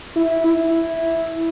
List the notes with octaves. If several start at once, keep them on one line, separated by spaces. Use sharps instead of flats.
E4
E4